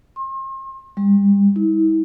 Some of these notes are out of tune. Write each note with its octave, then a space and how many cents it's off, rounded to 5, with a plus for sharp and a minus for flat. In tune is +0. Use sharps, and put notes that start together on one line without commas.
C6 +40
G3 +35
E4 -35